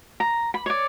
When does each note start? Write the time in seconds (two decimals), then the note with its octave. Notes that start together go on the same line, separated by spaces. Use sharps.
0.20 A#5
0.54 B5
0.66 C#5 D5